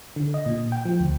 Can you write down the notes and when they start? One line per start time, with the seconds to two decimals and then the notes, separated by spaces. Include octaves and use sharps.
0.16 D3
0.34 D#5
0.46 A#2
0.72 G5
0.85 F3
1.00 D2